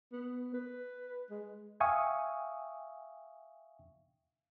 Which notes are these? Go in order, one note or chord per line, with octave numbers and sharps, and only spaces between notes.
B3
B4
G#3
E5 F5 G5 G#5 C#6 D#6